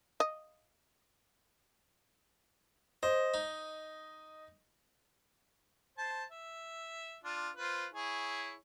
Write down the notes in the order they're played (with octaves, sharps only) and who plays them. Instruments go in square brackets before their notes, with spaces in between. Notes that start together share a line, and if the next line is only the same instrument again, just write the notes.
[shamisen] D#5
[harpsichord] C5 [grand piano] D#5
[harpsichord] D#4
[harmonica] C5 A5
E5
D4 F4
F4 B4 C5
E4 G#4 C#5